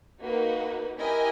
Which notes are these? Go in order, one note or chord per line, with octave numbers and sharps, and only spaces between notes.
A#3 D#4 F#4 B4
E4 G4 A#4 D#5 G#5